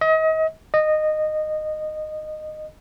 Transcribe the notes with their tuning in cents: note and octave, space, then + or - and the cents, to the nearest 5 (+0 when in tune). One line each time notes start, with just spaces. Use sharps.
D#5 +35
D#5 -15